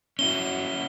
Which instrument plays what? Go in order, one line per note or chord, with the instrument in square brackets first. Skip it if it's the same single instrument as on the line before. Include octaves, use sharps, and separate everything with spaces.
[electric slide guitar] C#4 E4 F#4 [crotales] G7